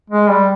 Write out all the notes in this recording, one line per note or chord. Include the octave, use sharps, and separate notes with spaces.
G#3
G3